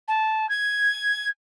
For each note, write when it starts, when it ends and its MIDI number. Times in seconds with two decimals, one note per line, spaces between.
0.08 0.48 81
0.49 1.28 92